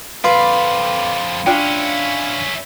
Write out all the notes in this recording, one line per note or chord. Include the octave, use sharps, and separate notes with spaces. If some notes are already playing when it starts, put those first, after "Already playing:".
F2 B4 D5 F5 B5 C6
C#4 D4 E4 F4 G5